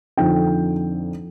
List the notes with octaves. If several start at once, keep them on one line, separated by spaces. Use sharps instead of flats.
F2 D3 F3 C4 D#4 G5